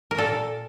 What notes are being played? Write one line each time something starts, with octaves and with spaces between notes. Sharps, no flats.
A#4
A#2 A4